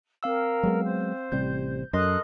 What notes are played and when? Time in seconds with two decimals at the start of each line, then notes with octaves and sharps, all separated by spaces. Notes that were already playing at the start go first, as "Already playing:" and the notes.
0.23 C4 A#4 F5 E6
0.63 F#3 G#3 B3
0.83 C5
1.32 A1 C3 G3 G6
1.93 F#2 A4 A#4 D#5 C6 D#6 F#6